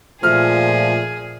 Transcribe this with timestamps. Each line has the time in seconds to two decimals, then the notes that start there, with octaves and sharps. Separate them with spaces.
0.23 A#2 F3 A3 G#4 F6